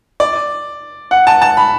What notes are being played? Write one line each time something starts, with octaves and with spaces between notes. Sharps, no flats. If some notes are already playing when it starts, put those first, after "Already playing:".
D5
F#5
A5
A5
B5